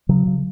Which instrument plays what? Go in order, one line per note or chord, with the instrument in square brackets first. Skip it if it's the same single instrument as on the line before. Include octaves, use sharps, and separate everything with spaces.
[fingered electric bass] C#3 F#3
C#3